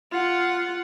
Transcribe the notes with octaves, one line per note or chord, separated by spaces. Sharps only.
F4 F#5